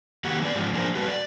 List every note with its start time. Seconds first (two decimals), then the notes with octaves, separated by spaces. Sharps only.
0.24 D#3 A#3 F#4 G4 F#5
0.42 E3 D5
0.55 G#2 F3
0.73 F3 A#3 D4 G#4 A#4 C5
0.95 G3 F#4 B4
1.08 D5